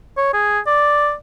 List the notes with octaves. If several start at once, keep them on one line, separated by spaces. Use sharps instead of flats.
C#5
G#4
D5